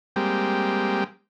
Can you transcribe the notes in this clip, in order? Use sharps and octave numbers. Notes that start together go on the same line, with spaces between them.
G3 G#3 A#3 C4 G4